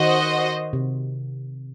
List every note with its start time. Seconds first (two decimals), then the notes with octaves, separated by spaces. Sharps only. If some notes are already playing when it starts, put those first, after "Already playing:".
Already playing: D#3 F#4 C5 D#5
0.73 C3